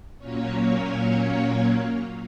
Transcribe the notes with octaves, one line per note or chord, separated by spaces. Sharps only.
A#2 F#3 A#3 C#4 C#5
C#4 C#5